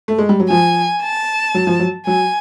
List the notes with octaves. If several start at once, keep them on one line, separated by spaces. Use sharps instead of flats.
A3
G#3
G3
F#3
F3 G#5
A5
F#3
F3
F#3
F#3 G#5